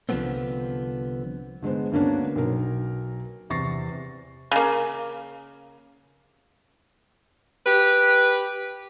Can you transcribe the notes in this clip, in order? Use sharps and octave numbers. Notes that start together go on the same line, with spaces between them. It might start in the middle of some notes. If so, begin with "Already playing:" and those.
C2 D3 F3 A3 B3 C4
D3 G#3 B3 C5
D2 D3 A#3 B3 C#4 D4
B1 A#4
E2 C3 C#6 A6 A#6 C7
C#3 A#3
G4 B4